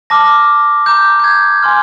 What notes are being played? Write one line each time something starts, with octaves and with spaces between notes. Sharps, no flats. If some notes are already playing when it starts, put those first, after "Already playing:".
A5 D6 F6 A#6
A#5 D6 G6
G6
G#6
G#5 C6 F6